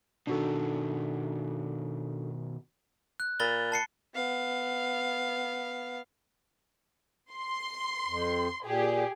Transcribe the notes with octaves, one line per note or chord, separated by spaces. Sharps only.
B2 D#3 D4 F#4 A4
F#6
A#2 B5 A6 G7
A5 C7 C#7
B3 F5
C6
F2
A#2 G4 G#4